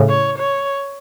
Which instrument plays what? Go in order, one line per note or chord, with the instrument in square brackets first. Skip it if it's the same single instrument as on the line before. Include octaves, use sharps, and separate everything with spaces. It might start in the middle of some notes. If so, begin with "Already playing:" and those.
Already playing: [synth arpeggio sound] A2 C#3
[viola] C#5
C#5